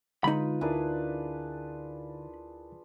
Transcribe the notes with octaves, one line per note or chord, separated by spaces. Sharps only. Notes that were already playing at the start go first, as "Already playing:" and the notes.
D3 G#3 D#4 F4 B4 B5
D2 D4 E4 G#4 A#4 B4